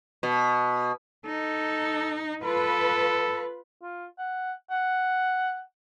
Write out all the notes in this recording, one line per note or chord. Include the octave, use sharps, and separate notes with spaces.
B2
D#4 A4
F4 A4 B4
F4
F#5
F#5